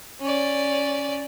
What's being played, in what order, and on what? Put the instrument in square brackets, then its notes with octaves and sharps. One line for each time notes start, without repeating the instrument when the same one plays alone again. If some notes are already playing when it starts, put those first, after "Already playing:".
[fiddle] C#4 D5